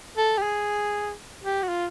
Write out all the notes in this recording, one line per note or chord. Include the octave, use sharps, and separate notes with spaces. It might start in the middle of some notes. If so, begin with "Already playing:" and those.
A4
G4
G#4
G4
F#4
F4